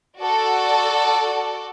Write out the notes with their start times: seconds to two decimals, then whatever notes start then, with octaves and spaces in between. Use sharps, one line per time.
0.19 F#4 A4 D5